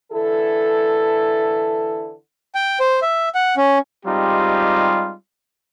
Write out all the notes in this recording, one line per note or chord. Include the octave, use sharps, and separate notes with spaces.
D3 E3 E4 A4
G5
C5
E5
F#5
C#4
G3 G#3 C4 D#4 F4 G4